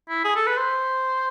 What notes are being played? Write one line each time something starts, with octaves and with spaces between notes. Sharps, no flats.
E4
G#4
A4
B4
C5